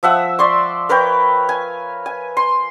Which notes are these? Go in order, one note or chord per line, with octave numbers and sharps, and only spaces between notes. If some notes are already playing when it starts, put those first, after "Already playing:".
F3 E5 F#5 E6
D5 C6 C#6
A#4 B4 C#5 G5
G#5
G#5
C6